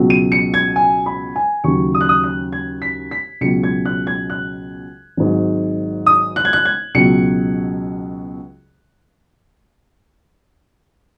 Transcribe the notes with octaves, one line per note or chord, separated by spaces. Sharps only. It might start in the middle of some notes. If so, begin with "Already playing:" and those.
Already playing: C#2 B2 F#3
D#7
C#7
G#6
G#5
B5
G#5
D#2 C#3 F#3 C#6
D#6
F#6
D#6
F#6
G#6
B6
B6
C#2 B2 F#3 C#7
G#6
F#6
G#6
F#6
G#1 G#2 F#3
D#6
F#6
G#6
F#6
G#6
C#2 B2 F#3 C#7